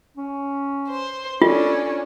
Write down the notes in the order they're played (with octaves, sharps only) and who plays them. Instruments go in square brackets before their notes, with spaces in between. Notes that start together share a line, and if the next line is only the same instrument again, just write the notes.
[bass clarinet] C#4
[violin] C5
[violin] C#4 D4 [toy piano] F4 [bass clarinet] A4